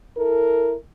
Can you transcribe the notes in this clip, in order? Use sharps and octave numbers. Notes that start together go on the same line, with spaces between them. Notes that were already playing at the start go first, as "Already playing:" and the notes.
E4 A4 A#4